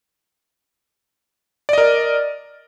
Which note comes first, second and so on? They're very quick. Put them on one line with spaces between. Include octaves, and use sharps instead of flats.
D5 D#5 A#4